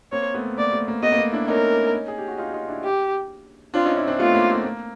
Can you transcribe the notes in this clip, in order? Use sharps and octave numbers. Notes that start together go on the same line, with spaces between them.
A#3 C4 C#5
A3 B3
A#3 D5
A3
A#3
A3 B3 D#5
A#3
A3 B3
D4 E4
C#4 D#4 A#4
G#4
G4
F#4
D#4 F4
D#4 F4
D4 E4
G4
C4 D4 F4
C#4 D#4
D4 E4
C4 D4
A3 B3 F4
A#3
A3
A#3